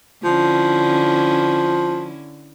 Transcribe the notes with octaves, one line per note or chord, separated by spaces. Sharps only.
D3 F3 C#4 E4